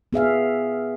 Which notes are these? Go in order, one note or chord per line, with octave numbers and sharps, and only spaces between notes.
B3 G#4 E5 F5